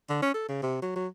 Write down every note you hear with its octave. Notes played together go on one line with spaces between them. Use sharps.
D3
C#4
A4
C#3
C3
F#3
F#3